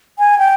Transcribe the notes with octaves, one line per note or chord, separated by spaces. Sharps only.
G#5
G5